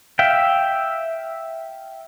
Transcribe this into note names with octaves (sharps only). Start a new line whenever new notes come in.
E5 F5 G5